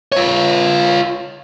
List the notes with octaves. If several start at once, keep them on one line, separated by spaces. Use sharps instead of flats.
F4 C#5